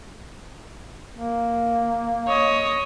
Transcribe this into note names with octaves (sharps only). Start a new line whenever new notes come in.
A#3
C#5 D#5